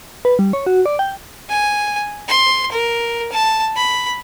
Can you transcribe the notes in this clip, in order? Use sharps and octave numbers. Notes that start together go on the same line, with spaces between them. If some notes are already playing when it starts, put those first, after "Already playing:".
B4
G3
C#5
F#4
D5
G5
G#5
C6
A#4
A5
B5